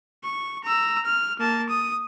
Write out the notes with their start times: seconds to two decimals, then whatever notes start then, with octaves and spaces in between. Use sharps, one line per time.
0.23 C#6
0.64 A#5 E6
1.05 F6
1.39 A#3 A5
1.69 D#6